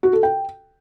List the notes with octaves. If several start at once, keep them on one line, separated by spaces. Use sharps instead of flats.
F#4
A4
G5